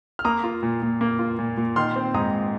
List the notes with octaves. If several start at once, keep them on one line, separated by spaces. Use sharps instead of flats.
F6
A#3 A#5 D#6
F4
A#2
A#2
A#3
F4
A#2
A#2
D#3 C6 F6
C4
G#2 A#5 D#6